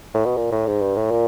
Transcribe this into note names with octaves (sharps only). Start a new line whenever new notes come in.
A2
B2
A#2
A2
G#2
G2
A2
A#2